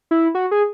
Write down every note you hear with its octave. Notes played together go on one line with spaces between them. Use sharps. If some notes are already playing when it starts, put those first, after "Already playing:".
E4
F#4
G#4